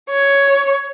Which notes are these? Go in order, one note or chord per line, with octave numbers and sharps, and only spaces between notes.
C#5